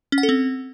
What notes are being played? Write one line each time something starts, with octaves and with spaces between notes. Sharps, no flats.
C#4
F#5
A4
C4